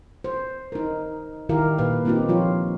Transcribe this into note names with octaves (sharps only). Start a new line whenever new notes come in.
C5
D#4 A#4
D#3 D#4 E4 G4 A#4 F5
A#2 B4 F5
A#3 C4 D#4 F4 G4
F3 F4 C#5